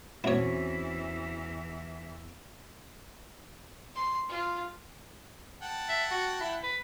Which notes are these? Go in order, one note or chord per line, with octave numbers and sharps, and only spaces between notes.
E2 E3 C4 C#4 E4 F#4 C#5
C6
F4
F#5 G5 A5
E5
F#4
E4
B4